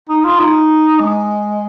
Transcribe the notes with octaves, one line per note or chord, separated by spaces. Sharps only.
D#4
F4
D#4
G#3